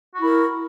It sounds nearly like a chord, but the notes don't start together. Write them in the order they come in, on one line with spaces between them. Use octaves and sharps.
F#4 E4 A#4